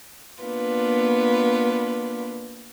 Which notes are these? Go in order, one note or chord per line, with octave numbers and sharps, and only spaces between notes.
A#3 B3 D4 F4 B4